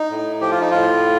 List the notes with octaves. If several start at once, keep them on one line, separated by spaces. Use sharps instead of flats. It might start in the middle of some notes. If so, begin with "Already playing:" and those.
Already playing: D#4
A2
F3 G4
F4
D#4
A2 F4